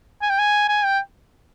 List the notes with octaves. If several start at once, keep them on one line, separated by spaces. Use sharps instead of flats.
G#5
G5
G#5
G#5
G5